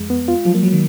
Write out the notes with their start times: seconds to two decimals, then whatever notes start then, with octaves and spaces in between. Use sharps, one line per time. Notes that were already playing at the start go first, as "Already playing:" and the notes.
Already playing: F2 G#3
0.10 B3
0.28 F4
0.45 F3 F#3
0.55 A#3
0.63 F#3
0.73 D#3